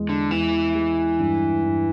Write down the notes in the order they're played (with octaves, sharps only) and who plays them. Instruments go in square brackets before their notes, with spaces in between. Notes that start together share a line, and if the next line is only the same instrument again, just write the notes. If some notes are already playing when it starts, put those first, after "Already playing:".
Already playing: [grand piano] E2 G#3
[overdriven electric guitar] D3
[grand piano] E2 [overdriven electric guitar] E3
[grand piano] G#3
G2
G2